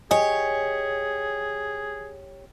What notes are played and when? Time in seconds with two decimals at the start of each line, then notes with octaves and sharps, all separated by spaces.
0.11 G4 G#4 C#5 D#5 G#5